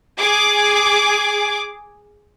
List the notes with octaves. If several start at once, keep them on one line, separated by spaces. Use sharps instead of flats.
G#4 D6